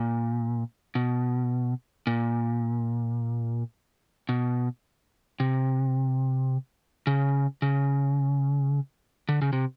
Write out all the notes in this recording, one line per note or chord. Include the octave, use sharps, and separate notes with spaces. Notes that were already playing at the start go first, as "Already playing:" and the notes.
Already playing: A#2
B2
A#2
B2
C3
C#3
C#3
D3
C#3
C3